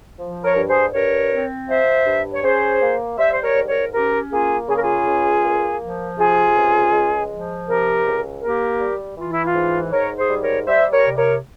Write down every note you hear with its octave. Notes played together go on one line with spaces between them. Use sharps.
F3
A#4 C#5
G2
G#4 C5
G2 A#4 C#5
C4
F3 C5 E5
G2
C#5
C#4 G#4 C5
A#3
G3 C5 E5
C5
A#4 C#5
G#2
A#4 C#5
C#4 G4 A#4
A#3 F4 G#4
C#3 G#4
A#4
F4 G#4
C#2
A#3
F3
C3 F4 G#4
C#2
G#3
F3
C3 G4 A#4
C#2
A#3 G4 A#4
G3
E3 F4
E4
F4
G#2
G#2 A#4 C#5
G#4 C5
G3
A#4 C#5
G3 C5 E5
A#4 C#5
C3
A#4 C#5